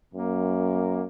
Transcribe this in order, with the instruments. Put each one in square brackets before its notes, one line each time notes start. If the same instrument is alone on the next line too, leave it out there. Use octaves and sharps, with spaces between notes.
[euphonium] F#2 [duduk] A#3